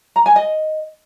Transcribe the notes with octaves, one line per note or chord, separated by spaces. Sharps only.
A#5
G#5
D#5